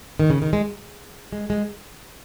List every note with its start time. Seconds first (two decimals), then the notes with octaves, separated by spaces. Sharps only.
0.20 D#3
0.30 C#3
0.42 D#3
0.53 G#3
1.33 G#3
1.50 G#3